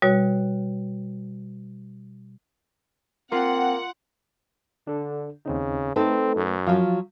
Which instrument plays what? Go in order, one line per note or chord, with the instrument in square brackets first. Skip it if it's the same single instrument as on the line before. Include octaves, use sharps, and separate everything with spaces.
[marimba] B2 G3 F#4 C#5
[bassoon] A#3 [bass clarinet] C4 [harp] F4 [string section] F#5
[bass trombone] D3 [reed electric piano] D4 A4
[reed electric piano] D#2 C4 D#4 [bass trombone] C#3
[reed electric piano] A3 B4 [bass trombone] C4 [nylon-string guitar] D#4 A4
[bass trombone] F#2
[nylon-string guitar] F3 F#3 [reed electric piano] F4 F5